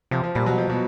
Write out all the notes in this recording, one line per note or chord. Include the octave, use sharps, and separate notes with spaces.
C3 F3
F3
A#2 G3
B2 F#3
F3
B2